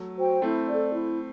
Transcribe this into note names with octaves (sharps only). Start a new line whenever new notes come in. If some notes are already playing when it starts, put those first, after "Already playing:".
Already playing: F#3 A3
F#4 C5 G5
A3 C4 E4
A4 D5
E4